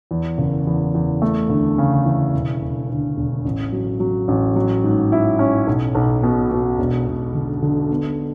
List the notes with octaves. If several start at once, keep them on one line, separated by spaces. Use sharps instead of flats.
E2
F#1
E2
E2
A3
D2
C#3
E3
E1
E1
D2
E1
A1
F#3
F#3
A1
F#3
G#2
E4
C#4
B1
B1
B2
B2
E1
E1
D3
D3
B3